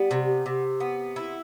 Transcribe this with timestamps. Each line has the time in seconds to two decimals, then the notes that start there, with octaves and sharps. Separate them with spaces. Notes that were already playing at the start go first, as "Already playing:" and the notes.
Already playing: G3 B3
0.11 C3
0.46 C3
0.80 B3
1.16 E4